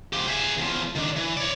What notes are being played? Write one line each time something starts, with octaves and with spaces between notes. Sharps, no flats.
F3 G4
G#4 E5
E2 F3
D#3 D4
E3
C#5 D5